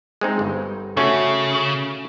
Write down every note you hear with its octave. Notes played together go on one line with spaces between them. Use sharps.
G#3 C4 D#4
G1
C#3 A3 C#4 F#4